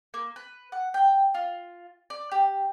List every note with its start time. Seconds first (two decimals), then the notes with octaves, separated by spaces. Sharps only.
0.14 A#3
0.36 B4
0.72 F#5
0.94 G5
1.34 F4
2.10 D5
2.31 G4